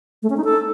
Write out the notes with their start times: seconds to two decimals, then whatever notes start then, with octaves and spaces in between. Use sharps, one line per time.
0.23 A3
0.30 C#4
0.37 D#4
0.44 A4